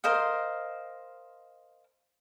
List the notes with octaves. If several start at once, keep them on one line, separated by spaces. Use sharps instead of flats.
A#4 C5 D#5 F5